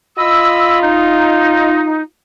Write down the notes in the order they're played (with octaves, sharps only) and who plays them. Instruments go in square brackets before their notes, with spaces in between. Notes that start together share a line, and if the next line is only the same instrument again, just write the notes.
[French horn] F4 [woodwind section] D#5 B5 E6
[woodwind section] D#4